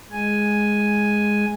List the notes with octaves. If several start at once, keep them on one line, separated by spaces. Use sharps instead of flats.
G#3 G#5